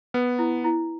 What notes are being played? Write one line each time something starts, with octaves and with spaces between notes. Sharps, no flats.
B3 B4
E4
E4